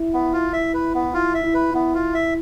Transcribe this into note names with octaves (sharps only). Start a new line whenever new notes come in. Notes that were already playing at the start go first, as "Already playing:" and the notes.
Already playing: E4
B3
F4
E4 E5
B4
B3
E4 F4
E5
E4
B4
B3 E4
F4
E5